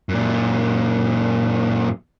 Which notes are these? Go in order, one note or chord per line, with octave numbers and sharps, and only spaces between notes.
F#2 A#2